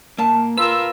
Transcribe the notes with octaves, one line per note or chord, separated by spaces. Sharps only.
A#2 A#3 A5
F4 A#4 B4 E6